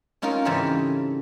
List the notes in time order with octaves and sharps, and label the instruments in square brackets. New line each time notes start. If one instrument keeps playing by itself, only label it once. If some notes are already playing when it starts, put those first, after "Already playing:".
[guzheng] C4 C#4 D#4 F4 A#4 C#5
G#2 C#3 E3 C4 G4 A4